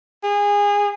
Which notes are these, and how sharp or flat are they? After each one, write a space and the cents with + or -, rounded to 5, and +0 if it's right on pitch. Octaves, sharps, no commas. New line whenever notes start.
G#4 -25